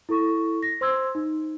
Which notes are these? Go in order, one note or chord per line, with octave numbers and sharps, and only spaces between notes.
E4 A4 C#6
A#6
C5 C6 E6 G#6
D#4